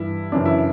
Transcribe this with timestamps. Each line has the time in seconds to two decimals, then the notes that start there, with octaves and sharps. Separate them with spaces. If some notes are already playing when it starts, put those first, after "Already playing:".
Already playing: G2 E3 E4
0.32 F#2 C#3 E3 D4
0.45 E4